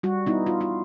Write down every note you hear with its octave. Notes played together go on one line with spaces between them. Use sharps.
G3 F#4
B3 D#4 E4
F4
F4